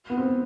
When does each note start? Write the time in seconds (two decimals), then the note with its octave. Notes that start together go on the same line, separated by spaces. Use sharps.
0.10 B3
0.17 C4